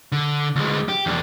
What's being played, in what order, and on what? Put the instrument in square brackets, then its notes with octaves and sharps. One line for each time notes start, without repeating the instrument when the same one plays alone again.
[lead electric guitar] D3
D2 G#3
G4
E2 D4